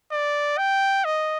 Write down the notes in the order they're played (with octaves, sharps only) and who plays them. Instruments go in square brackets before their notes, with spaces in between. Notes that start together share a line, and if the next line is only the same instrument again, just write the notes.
[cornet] D5
G5
D#5